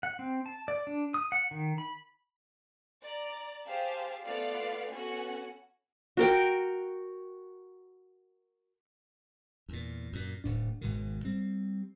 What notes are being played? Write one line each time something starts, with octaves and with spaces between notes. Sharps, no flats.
F#5
C4
A5
D5
D4
D#6
F#5
D#3
B5
D5 A#5
G4 G#4 C5 F5 A5
A3 B3 F4 D5 F5
B3 C#4 F#4 A4 G#5
F#4 A#4 G5
E2 A#2
F#2 A#2
D1 A2 D4
G#1 G#2 B2 D#3
G3 C4